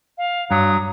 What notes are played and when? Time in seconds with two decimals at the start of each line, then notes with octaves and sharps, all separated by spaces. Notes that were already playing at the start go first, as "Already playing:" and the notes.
0.18 F5
0.51 G2 F#3 D#6